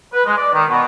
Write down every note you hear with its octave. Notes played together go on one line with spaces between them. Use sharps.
B4
G#3
D5
D#3
B2